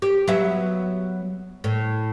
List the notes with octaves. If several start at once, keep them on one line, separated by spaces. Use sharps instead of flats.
G4
F#3 B3 E5
A2